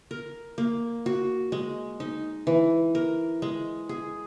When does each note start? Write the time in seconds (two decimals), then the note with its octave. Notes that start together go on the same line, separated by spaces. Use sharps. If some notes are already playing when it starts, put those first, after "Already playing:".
0.11 A#4
0.58 A#3
1.06 F#4
1.52 G#3
2.00 D#4
2.47 E3
2.95 A#4
3.42 G#3
3.89 G#4